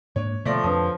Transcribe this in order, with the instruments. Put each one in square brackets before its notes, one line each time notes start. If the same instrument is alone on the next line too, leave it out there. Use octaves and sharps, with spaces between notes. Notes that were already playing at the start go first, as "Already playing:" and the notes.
[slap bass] G#2 A#3 D4 [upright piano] C#5
[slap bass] B2 D3 [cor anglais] F3 [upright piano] A3 D5 A#6
[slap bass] F2 [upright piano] D3 D#6 [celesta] B4 C#5 A5